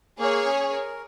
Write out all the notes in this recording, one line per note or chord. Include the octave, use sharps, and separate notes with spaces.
A#3 G#4 C#5
C#4
A#4